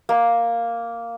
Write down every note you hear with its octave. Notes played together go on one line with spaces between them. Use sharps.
A#3